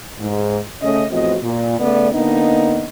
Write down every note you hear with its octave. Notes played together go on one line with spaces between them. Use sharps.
G#2
C#3 A3 C#4 D#5
E2 A2 F3 C4 F#4 D#5
A#2
C#3 A3 B3 D5
D3 A#3 B3 D4 D#4 D#5